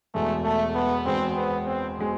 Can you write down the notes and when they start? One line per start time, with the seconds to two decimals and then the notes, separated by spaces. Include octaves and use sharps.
0.15 E1 E2 B2 G#3 A3
0.44 A3
0.75 B3
1.06 E1 E2 B2 G#3 C4
1.36 B3
1.66 C4
1.99 B2 G#3